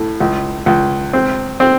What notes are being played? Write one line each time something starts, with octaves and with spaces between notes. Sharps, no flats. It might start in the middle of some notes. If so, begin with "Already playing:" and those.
Already playing: A2
C#2
C#2
C4
C4